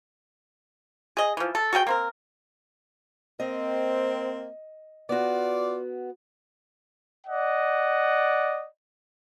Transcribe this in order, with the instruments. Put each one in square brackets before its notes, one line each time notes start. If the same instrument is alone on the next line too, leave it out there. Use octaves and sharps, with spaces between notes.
[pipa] G#4 D#5
E3 F3
A4
F#4 G#4 A4 G5
A#3 C4 A#4
[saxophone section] A#3 C4 [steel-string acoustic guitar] D#5
[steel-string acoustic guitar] B3 F#4 [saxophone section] F4 D5
[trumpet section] D5 D#5 F#5